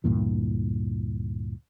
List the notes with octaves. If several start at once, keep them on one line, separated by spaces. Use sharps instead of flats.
D2 G2 A#2 E3